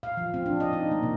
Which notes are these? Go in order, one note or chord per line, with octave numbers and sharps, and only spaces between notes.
F5
F3
C4
D4
D#5
D#4
A#3
C3